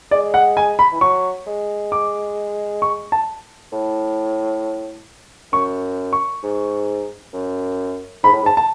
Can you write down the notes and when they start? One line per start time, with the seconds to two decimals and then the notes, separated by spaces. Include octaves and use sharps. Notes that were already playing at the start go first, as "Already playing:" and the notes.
0.11 G#3 D5
0.34 F#5
0.57 G#5
0.79 B5
0.92 E3
1.01 F#3 C#6
1.47 G#3
1.92 D6
2.82 C#6
3.12 A5
3.72 A2
5.53 F#2 C#6
6.13 C#6
6.43 G#2
7.34 F#2
8.24 G#2 B5
8.33 A2
8.43 G#2
8.46 A5
8.57 A5